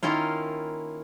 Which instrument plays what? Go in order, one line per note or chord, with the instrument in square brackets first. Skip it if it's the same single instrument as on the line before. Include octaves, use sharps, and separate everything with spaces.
[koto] D#3 A#3 C#4 E4 F4